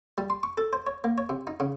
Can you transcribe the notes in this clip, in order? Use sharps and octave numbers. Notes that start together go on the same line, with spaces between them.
G3
C6
C#6
A4
C5
C#5
A#3
C#5
C3
D#4
C#3